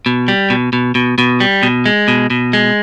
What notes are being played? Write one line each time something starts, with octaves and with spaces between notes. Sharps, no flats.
B2
G3
B2
B2
B2
B2
G3
B2
G#3
B2
B2
G#3